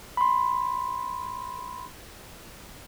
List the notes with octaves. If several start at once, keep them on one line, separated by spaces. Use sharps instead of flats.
B5 C6